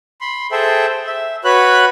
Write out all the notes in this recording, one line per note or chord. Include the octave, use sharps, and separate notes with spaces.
B5 C6
G#4 A4 C5 E5 G5
E5
F#4 B4 C#5 B5 F#6